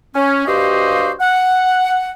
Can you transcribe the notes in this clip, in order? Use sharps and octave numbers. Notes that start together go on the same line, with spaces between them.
C#4
G2 F#4 G4 C5 D#5 F5
F#5